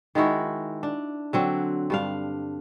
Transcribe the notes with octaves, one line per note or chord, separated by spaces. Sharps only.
D#3 G#3 E4 F#4
D4
D3 F#3 C4
G2 D4 F5